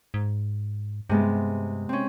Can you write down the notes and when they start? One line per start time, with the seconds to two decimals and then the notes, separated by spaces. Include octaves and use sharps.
0.14 G#2
1.10 G2 C3 G#3 B3
1.89 C4 C#4